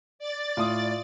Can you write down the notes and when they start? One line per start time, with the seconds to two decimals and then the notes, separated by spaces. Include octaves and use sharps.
0.19 D5 A6
0.57 A2 F4 D#6